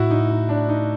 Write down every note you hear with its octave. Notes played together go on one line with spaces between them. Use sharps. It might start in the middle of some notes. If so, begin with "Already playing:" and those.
Already playing: A2 E4 F#4
D#4
D#4
D4
D#4